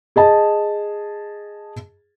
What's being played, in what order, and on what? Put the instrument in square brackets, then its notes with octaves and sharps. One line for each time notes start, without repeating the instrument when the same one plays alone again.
[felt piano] G#4 D#5 A5